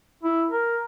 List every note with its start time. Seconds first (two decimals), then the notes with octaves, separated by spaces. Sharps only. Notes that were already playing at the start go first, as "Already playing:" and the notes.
0.23 E4
0.50 A#4